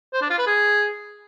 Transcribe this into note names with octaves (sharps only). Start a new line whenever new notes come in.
C5
D4
F4
B4
G#4